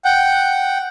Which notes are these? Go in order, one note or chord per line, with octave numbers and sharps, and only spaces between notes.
F#5 G5